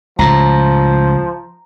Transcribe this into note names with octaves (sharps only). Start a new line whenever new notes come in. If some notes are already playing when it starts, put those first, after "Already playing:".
C#2 A2 F3 A#5